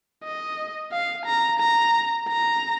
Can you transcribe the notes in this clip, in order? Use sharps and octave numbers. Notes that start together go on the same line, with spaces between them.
D#5
F5
A#5
A#5
A#5